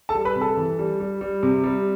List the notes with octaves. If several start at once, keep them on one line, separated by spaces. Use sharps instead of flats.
A4 A5
G3
B4 B5
C3
A4 A5
E3
G3
G3
G3
C3
G3